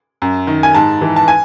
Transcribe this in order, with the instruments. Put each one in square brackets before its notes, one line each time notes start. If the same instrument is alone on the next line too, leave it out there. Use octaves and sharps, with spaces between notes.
[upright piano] F#2
D#3
G#5
G#2 A5
E3
A5
G#5